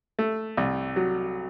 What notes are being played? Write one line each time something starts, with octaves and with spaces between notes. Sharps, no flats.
A3
C2
F#3